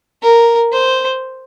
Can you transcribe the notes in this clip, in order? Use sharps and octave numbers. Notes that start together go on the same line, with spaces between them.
A#4
C5